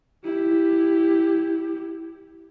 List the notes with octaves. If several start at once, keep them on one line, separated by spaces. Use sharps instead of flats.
E4 G4